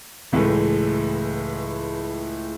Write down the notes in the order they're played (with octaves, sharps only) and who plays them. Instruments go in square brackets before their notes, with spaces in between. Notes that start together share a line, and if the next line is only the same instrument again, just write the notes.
[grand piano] C#2 A2 E3 G#3 A3